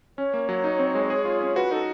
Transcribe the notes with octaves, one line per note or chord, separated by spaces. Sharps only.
C#4 C#5
A#3
F#3
D#4
C4
G#3
G#4
F4
C#4
F#4 B4
D#4 A4